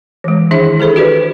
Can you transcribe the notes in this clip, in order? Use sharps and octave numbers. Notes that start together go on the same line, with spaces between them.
E3 G#3
D#3 D4 E4 G#4 E5
G#4 A4 C5 B5
F#4 G4 B4 D5